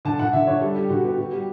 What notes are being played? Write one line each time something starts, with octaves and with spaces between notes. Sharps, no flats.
D3 A5
D3 F#5
D3 E5
D3 C#5
G3 A4
G3 G4
D3 F#4
B3 G4
B3 F#4
G3 G4